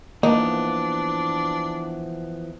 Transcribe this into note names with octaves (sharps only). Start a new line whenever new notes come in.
E3 F3 A#3 B3 D4 D#4